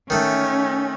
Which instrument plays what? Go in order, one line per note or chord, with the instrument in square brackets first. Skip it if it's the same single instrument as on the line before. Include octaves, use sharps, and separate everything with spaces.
[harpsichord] D#3 A3 [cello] C#4